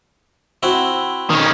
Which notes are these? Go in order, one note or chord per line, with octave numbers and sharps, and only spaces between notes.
C4 E4 F#4
D#3 C#4